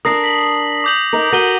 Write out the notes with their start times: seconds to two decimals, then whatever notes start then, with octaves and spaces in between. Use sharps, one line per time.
0.05 D4 A#4 D#6 A#6 C7
0.23 B6 F#7
0.84 D6 G6 F#7
1.13 D#4 A#4
1.32 F#4 A#4 A#6 D#7 G7